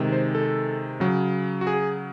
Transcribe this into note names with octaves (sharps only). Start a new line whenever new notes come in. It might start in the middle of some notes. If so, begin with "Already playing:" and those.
Already playing: C3 D#3 G#3
C5
A4
C#3 F#3
F#4
G#4